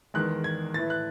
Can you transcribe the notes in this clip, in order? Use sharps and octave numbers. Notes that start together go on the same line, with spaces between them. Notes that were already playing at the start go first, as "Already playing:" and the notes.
E2 D#3 G#3 F#6
G#6
A2 E3 A3 A6
F#6